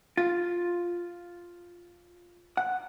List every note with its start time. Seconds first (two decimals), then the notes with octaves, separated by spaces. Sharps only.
0.17 F4
2.57 F#5